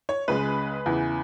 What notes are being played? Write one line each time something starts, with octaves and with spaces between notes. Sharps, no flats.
C#5
C#2 C#3 G#3 B4
E2 C#3 E3